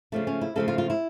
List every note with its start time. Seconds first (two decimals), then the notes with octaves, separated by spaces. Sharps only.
0.12 C#3 F3 A3 D4
0.27 C#4
0.41 E4
0.56 C#3 F3 A3 A4
0.68 F4
0.78 F4
0.90 E4